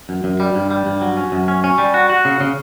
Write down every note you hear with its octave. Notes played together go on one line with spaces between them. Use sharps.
F#2
F#2
G3
G2
G3
G2
F#3
C#4
F#2
C#4
C#4
G3
F#4
F#4
C#3
C#3